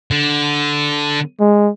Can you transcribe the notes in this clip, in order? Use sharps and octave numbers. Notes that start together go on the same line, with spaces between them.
D3
G#3